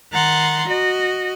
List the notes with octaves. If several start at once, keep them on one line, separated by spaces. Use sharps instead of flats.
D#3 F#5 A#5 C6 A6
F#4 D#5